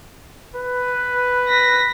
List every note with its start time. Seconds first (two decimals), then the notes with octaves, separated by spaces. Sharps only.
0.55 B4
1.48 A#6 B6